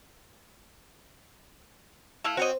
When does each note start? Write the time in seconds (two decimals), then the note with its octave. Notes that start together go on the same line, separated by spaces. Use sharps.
2.24 A3 E4 F5
2.37 C4 F#4 C#5 D#5